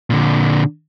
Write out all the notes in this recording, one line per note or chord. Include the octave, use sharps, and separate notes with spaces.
A#2 D3